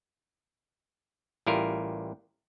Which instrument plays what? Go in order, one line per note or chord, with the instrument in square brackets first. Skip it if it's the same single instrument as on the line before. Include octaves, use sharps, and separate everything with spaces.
[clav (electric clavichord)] A1 G3 E4 F4 A#4